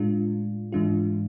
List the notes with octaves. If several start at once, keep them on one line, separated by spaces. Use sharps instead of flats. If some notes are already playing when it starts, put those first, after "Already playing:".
Already playing: A2 G#3 D4 F4
G#2 E3 G#3 D4 F4